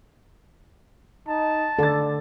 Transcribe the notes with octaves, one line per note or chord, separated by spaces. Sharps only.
D#4 A5
D3 A4 D5 A6